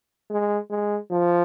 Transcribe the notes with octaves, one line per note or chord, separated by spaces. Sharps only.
G#3
G#3
F3